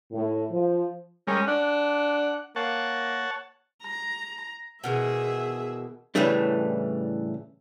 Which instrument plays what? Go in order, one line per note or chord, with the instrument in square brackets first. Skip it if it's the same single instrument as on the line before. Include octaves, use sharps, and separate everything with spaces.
[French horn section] A2
F3
[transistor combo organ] G3 G#3 A#4 [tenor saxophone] C#4
[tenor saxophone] D4 [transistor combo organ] F#5
[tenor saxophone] A#3 [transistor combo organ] C#5 F#5 A5
[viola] A#5
[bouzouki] B2 D#3 E3 [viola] G#4 E5
[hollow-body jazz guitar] A2 C#3 E3 G3 A3 D4